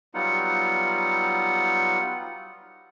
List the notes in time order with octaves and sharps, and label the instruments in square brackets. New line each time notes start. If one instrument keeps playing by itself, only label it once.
[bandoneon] F#3 G3 B3 D#4 F4 F#5